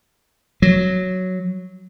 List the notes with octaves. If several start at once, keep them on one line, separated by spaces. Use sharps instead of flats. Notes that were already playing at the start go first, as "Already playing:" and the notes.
F#3